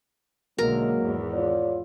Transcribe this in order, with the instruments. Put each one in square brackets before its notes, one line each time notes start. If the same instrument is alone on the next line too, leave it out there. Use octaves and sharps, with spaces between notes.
[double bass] B1 D3 [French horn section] F#3 G#3 A#3 [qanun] A#4
[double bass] G#1 E2
[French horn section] F4 C#5 D5